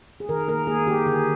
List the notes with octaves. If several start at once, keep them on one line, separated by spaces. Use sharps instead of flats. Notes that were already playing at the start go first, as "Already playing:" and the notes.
G#4
D#3 A#4
A#3 A#4
A#3 G#4
D#3 G4
D3 G#4